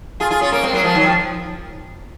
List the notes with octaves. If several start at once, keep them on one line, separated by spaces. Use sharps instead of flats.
F4 G#4
F4 G#4
C#4 F4
A#3 C#4
G#3 C4
F#3 A#3
F3 G#3
D#3 F#3
F3